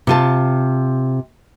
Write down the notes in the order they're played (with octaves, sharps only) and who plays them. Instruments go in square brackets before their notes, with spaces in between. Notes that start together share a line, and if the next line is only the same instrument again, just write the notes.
[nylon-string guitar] C3 F4 A5